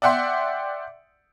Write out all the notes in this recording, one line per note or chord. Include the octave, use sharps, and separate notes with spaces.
D5 E5 F#5 G5 C6